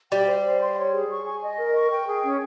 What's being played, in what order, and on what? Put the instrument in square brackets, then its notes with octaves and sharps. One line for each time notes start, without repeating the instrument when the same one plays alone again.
[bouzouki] G3 [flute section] G5
[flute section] C5
C5
C6
C#5
G#4
C#6
G#5
D#5
A#4
C#6
G5
G#4
C#4